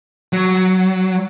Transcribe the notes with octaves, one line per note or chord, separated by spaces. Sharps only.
F#3